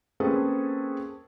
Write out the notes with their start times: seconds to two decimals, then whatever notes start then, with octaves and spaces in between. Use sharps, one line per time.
0.20 A#3 C4 C#4 G#4 A4 B4